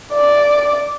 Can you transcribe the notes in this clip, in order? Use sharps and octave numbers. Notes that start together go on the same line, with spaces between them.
D5